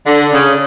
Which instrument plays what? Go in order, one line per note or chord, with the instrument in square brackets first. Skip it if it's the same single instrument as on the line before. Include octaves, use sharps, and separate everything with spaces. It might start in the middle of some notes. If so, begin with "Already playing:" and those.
[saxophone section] D3
C#3